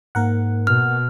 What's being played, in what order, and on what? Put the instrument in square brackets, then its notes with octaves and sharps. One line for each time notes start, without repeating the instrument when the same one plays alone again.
[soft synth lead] G#2 [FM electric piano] A#3 A#4 F#5
[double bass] B2 [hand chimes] F6